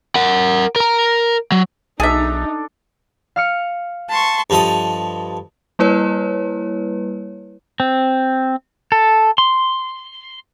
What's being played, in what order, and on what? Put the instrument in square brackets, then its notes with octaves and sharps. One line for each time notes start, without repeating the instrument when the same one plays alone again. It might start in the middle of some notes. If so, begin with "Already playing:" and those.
[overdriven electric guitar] A#4 F#5
A#4 A#5
F#3
[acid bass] B1 [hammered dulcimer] D4 A4 [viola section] D#4 [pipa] G#4 E5
[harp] F5 F6 C#7
[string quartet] A5 C6 C#6
[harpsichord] G2 F3 A4 D#5
[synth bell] G3 A#3 E4 B4 C#5
[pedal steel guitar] C4
A4
C6